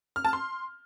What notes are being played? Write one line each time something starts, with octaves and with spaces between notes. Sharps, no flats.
F6
A5
C6